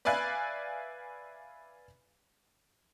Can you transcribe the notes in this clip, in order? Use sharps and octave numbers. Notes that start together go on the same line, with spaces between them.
B4 D5 E5 F5 G#5 F#6